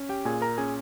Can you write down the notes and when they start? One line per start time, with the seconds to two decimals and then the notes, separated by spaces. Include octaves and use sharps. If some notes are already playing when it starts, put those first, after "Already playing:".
Already playing: C#4
0.09 G4 G5
0.25 A#2 G#4 G#5
0.41 A#4 A#5
0.58 C#4 G#4 G#5